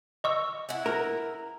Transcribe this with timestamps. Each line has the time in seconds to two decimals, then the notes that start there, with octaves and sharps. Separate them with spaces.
0.24 D#5 C#6 E6
0.69 E4 F#5
0.86 A#4